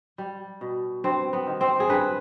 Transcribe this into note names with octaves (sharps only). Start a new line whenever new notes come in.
G3
B2
G2 C4
B3
D#3
C4
G#4
G2 B4